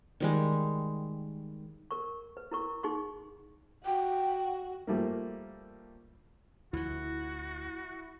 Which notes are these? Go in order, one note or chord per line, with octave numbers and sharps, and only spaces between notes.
D#3 G3 G#3
A#4 C#6
B4
E4 A#4 C#6
D#4 G#4 C6 C#6
F#4 G5
F3 G3 A3 A#3
D2 F3 E4 F#4